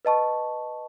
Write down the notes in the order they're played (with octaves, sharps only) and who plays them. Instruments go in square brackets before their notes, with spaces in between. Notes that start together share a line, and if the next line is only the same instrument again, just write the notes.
[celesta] B4 D#5 A5 C#6